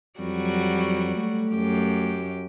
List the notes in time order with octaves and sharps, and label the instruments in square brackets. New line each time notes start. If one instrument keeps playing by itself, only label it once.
[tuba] F2 [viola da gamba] F#3 G3 F#4
[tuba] A3
[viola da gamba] F#2 G4